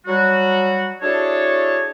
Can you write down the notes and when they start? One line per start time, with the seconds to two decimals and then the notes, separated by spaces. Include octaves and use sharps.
0.07 F#3 G3 F#4
1.02 D4 E4 F#4 G#4 A4 C#5